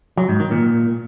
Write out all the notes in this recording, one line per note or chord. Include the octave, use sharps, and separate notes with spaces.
F#3
G#2
D#3
A#2